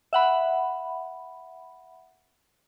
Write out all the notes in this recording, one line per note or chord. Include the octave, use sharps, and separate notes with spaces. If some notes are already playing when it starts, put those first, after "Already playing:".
E5 F#5 B5